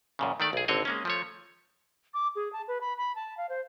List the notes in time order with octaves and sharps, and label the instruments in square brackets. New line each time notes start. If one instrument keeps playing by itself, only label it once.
[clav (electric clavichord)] F#2 A#2 C#3
D#3 A3 D5
B1 G#4
G#1 D3 C4 C#5 D#5
G#3 A#3 C#4
F3 A3 C#5
[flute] D6
G#4
A5
B4
B5
B5
A5
F5
C5